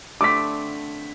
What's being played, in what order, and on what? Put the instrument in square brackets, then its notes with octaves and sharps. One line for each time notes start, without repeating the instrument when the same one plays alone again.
[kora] D3 A3 C4 [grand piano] D6 B6